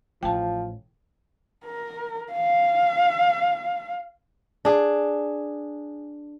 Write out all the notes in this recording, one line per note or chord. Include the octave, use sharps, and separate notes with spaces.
A1 F3 G5 A5
A#4
F5
D4 G#4